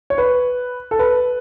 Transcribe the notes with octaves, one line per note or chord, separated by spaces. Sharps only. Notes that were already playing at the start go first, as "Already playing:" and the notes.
C#5
B4
A4
B4